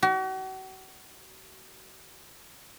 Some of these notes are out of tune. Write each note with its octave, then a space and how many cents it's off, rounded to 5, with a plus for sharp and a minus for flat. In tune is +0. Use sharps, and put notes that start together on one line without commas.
F#4 +40